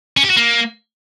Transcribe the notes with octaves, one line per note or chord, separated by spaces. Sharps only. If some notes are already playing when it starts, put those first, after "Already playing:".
C#4
G4
F#4
A#3